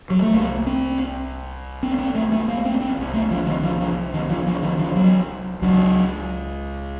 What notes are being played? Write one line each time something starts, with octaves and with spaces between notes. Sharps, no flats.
F#3
A3
C2 C3 A#3
C4
C4
C4
A3
A3
A#3
C4
C4
C2 C3
A3
F3
D#3
F3
F3
D#3
F3
F3
D#3
F3
F#3
C#2 C#3 F#3